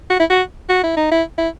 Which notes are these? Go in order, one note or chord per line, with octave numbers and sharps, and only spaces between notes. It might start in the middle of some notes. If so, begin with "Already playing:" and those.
F#4
E4
F#4
F#4
E4
D#4
E4
E4